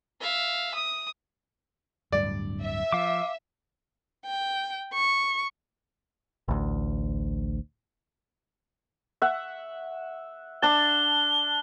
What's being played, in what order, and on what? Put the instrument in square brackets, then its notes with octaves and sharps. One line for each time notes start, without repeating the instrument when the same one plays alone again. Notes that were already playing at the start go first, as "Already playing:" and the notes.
[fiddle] E5 F5
D#6
[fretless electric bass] D1 G2 [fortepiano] D5
[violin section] E5
[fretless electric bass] F3 [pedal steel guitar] F5 D6
[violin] G5
C#6
[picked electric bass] A1 D2
[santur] E5 F#5
[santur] D4 A5 [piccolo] G7